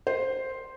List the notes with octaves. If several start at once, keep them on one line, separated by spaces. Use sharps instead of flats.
C5